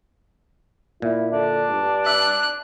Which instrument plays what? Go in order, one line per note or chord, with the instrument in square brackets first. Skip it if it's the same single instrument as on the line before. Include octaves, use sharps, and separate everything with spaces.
[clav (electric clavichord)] A#2 [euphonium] E4
[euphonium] D3 [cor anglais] D4
[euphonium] G2
[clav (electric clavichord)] E5 [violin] F#6